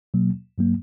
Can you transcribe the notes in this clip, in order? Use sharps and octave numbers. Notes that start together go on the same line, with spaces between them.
B2 F#3 A#3
G2 F#3 A#3